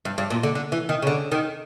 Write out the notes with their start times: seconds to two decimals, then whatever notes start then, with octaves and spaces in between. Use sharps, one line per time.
0.05 G2
0.18 G2
0.30 A#2
0.43 D3
0.55 D3
0.72 E3
0.89 D#3
1.02 C#3
1.07 D3
1.32 D#3